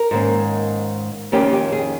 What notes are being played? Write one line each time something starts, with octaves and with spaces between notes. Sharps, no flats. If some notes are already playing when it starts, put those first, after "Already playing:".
Already playing: A#4
G#2 D#3 A#3 C#4
F2 D#3 A#3 C#4 G4
G4
G#4